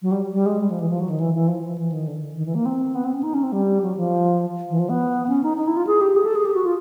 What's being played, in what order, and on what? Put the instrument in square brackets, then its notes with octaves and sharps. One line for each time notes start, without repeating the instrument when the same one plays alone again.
[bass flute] F#3
G3
G3
G#3
G3
F3
E3
F3
F#3
D#3
E3
E3
F3
F3
E3
D#3
D3
D#3
E3
A#3
C4
B3
C4
C#4
D#4
C#4
C4
G3
F#3
F3
E3
F3
B3
C#4
D#4
D#4
E4
F4
G#4
G4
G#4
A4
G#4
G4
F#4
F4